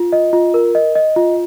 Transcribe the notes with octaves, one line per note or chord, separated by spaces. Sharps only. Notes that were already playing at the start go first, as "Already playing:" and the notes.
Already playing: F4
D#5
F4
A#4
D#5
D#5
F4